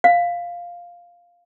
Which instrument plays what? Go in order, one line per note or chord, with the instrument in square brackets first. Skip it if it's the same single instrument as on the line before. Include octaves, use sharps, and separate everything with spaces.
[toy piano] F5